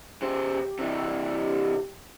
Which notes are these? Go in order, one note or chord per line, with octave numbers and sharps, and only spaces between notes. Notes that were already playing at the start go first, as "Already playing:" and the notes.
C#3 G4 C5
C3 E3